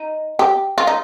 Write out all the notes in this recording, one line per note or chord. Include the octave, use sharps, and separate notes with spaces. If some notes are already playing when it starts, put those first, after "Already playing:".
Already playing: D#4
G4
F4
D#4